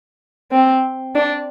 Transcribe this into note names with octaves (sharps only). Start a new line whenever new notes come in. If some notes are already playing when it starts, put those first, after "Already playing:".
C4
D4